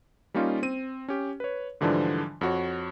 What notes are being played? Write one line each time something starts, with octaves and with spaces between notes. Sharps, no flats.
G3 A#3 C#4 D#4 F4
C4 D#7
C#4 G4
B4 C#5
G#2 D3 E3 F3 G3 D4
F2 F#4 C#5